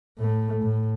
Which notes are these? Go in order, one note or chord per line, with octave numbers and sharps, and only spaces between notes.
A2 A3
A2